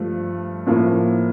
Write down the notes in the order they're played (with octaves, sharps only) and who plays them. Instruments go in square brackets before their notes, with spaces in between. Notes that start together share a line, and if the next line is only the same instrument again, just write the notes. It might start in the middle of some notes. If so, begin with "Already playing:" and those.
Already playing: [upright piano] G2 F3 A3
A2 F3 A#3